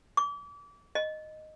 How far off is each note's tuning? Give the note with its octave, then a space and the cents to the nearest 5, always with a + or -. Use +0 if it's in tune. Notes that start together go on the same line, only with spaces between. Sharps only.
D6 -35
D#5 -5